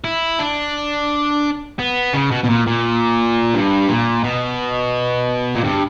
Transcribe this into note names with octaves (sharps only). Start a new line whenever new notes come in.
E4
D4
B3
C#3
B2
B2
A#2
A#2
G2
A#2
B2
A#2
G2